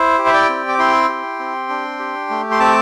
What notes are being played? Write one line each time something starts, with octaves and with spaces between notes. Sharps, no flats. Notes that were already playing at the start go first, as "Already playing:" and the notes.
Already playing: E4 C5
G4
E5
D5 G5
C4
D6
E4 G5 C6
G4
C4
D4
G4
A3
C6
C4 A5 D6